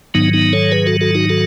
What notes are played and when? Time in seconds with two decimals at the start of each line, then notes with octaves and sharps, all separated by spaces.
0.14 G#2 D#3 F#3 B3 D#4
0.33 B3 D#4
0.53 A4 C#5
0.72 G#4 B4
0.87 F#4 A4
1.01 F#4 A4
1.15 D#4 F#4
1.29 F#4 A4